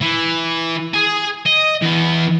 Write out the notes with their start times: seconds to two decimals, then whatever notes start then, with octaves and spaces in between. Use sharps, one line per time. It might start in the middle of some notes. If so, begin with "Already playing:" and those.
0.02 E3
0.94 G#4 G#5
1.46 D#5
1.82 E3 B3